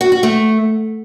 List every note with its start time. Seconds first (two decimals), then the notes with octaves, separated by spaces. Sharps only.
0.01 F#4
0.12 F#4
0.23 A3